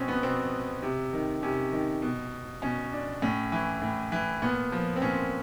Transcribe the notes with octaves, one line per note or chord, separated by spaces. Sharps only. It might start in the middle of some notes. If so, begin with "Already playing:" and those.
Already playing: B2 C4 C#4
B3
B2 C4
C3
D#3
C3 C#4
D#3
B2
B2 C#4
D4
A2 C#4
E3
A2
E3
A#2 B3
F3
C4
A#2 C#4